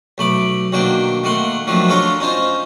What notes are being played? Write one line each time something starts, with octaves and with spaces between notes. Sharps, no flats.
B1 A3 B5 D6
B1 D#3 F#3 A#3 D4 G5
D#3 A3 A#3 F#5 C6
D#3 F3 F#3 A3 C4 D4
D4 A4 C#5 F5 A#5 C6
C#4 D#4 F4 C5